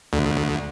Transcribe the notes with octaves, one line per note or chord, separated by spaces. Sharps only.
D2